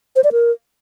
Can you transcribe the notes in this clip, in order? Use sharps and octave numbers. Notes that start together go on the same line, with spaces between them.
C5
D5
A#4